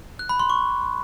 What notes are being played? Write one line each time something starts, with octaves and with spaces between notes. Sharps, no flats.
F#6
B5
C6
C#6